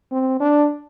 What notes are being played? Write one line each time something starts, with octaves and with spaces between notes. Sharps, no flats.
C4
D4